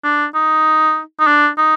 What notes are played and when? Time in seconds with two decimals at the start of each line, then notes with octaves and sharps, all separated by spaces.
0.04 D4
0.35 D#4
1.20 D#4
1.27 D4
1.58 D#4